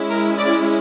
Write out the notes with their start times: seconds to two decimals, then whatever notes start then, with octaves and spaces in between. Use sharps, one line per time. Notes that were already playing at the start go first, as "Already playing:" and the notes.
Already playing: G#3 C#4 E4
0.08 A#4
0.38 D5